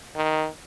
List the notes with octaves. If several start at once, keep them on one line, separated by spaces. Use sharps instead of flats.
D#3